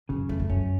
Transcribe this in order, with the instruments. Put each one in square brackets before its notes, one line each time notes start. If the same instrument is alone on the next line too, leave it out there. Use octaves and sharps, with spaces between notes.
[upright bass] F#2 [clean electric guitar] C#3
[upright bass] F2 [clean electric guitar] A3
[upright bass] A2
[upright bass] F#2 [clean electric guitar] C#4